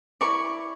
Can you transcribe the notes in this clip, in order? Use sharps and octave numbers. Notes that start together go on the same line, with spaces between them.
E4 A#4 D5 C#6